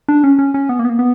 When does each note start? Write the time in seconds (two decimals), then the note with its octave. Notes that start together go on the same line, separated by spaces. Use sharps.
0.08 D4
0.24 C#4
0.39 C#4
0.54 C#4
0.69 B3
0.79 A#3
0.85 B3
0.89 A#3
0.99 B3